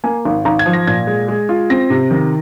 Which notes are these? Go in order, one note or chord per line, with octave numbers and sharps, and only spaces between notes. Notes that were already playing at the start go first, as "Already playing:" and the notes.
A#3 G#5
G#1
G#1 A#5
G#6
F3
A#6
A#2 G#6
G#3
G#3
F4
C4 A#6
C3
D#3